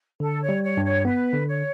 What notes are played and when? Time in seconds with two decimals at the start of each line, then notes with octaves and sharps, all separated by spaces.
0.20 D3 A4
0.42 C#5
0.49 G3
0.63 C#5
0.77 G2
0.84 C#5
1.05 B3 B4
1.33 D3
1.48 C#5